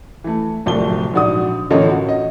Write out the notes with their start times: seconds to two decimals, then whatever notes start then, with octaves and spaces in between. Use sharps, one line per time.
0.24 E3 A3
0.66 D1 C2 F3 A3 D5 G7
1.14 A#1 G#2 F#4 D5 D#6
1.71 A1 D3 A#3 F4 C#5 D#5
1.90 F#4
2.09 D#5